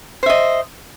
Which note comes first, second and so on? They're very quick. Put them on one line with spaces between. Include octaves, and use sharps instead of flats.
C5 E5 D#5